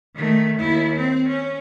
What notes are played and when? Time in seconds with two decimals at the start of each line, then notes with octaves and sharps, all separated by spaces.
0.15 D#3 A3
0.59 D#2 E4
0.96 C4
1.28 C#4